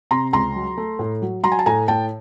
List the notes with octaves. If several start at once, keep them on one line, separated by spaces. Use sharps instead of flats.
C3 A#5 C6
C#2 A#5 C6
F#3
A3
A2
F#3
F#3 A#5 C6
G#5
A5
A2 G#5 A#5
A2 G5 A5